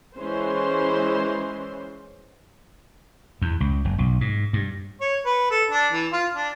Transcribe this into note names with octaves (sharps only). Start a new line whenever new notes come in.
E3 G#3 C#4 C5 C6
E2
C#2
F#1
B1
G#2
G2
C#5
B4
A4
D4
E3
F4
D4